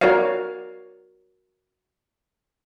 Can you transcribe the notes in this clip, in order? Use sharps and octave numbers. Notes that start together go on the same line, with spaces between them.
F#4 A#4 C#5 D5 F5